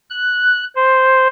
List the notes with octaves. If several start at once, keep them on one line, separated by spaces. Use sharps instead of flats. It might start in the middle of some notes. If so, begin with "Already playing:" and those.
F#6
C5